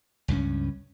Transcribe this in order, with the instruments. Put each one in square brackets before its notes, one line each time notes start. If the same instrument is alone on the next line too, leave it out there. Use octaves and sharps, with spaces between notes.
[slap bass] C#2 G2 G3 C#4